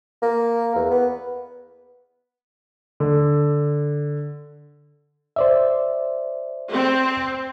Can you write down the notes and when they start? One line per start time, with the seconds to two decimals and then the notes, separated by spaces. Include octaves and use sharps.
0.22 A#3
0.75 E2
0.91 B3
3.00 D3
5.36 C5 D5 E5
6.72 C4